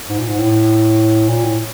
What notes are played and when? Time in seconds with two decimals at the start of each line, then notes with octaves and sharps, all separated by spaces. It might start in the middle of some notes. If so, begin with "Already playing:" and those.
0.09 G#2
0.19 A#2
0.29 G#2
0.39 A2
1.29 A#2
1.44 A2